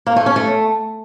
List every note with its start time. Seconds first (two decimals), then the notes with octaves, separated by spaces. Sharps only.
0.07 A#3
0.16 A3
0.26 C#4
0.36 A3